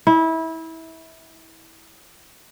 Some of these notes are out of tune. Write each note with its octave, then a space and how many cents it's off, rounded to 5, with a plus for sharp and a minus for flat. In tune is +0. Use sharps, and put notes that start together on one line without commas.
E4 -25